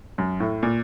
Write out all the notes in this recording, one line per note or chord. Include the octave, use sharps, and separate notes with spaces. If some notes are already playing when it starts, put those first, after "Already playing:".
F#2
A2
A#2